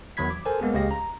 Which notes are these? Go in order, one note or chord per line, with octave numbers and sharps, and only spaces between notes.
E2 D#3 F#3 B5 G#6 B6
D6
A4 A#4 C5 G#5 A5
G#3 A#3 B3 G#4
C#2 C#3 G#3 G4 F5 A#6
A#5